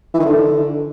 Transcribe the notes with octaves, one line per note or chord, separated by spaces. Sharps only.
E3
D#3
D3